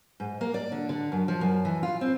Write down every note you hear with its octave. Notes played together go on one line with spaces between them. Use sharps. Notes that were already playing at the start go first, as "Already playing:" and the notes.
G#2
A#3
D5
D3
D3
F#2
F3
F#2
E3
F4
C4